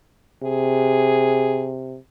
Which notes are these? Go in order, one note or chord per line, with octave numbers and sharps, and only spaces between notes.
C3 G#4